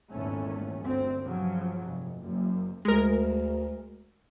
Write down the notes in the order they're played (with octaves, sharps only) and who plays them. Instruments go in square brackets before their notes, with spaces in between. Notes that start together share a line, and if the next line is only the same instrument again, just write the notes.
[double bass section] G#1 E2 A#2 A3 C#4
G1 D2 C4
G2 C#3 F3 F#3
F1
F#1 F#2
[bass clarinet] D2 [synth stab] G#3 A#4